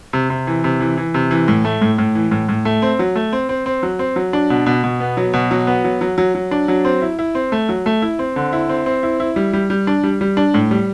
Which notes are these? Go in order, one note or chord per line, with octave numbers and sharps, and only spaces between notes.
C3
C3
E3
C3
E3
E3
C3
E3
A2
A3
A2
A2
E3
A2
A2
A3
C4
F#3
A3
C4
C4
C4
F#3
C4
F#3
D4
B2
B2
B2
B3
F#3
B2
F#3
B3
F#3
F#3
F#3
F#3
D4
F#3
C4
E4
E4
C4
A3
F#3
A3
E4
C4
D3
E4
C4
C4
E4
E4
G3
G3
G3
D4
G3
G3
D4
A2
G3